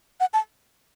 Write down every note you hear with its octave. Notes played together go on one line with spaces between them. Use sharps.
F#5
A5